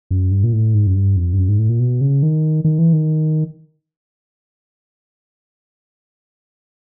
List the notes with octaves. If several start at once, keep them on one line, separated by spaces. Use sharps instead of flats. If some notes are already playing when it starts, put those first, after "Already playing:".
F#2
G2
A#2
A2
G#2
F#2
G2
F2
G2
F#2
G#2
A2
A#2
B2
C#3
D#3
D#3
E3
D#3